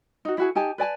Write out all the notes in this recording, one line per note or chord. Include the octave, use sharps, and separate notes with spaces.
D#4 F#4
E4 F#4 G#4
D#4 G4 G#5 A5
B4 D5 G#5 A5